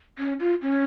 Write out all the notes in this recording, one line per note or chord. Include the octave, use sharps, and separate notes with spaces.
C#4
F4
C#4